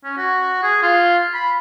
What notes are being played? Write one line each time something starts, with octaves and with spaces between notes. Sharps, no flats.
C#4
F#4
G#4
F4
B5